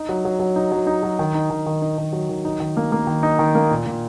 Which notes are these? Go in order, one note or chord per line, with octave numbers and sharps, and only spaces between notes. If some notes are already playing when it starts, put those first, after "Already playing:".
Already playing: D#4
F#3
F#3
F#3
D#4
F#3
D#4
F#3
D#3
D#4
D#3
D#3
D#4
D#3
F#3
D#3
D#4
D#3
A#3
A#3
D#3
D#4
D#3
A#3
A#2
A#2